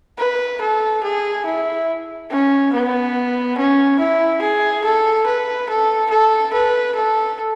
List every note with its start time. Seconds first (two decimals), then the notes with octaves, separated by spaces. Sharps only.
0.18 B4
0.61 A4
1.03 G#4
1.46 E4
2.30 C#4
2.73 B3
3.58 C#4
3.99 E4
4.42 G#4
4.84 A4
5.26 B4
5.69 A4
6.10 A4
6.53 B4
6.95 A4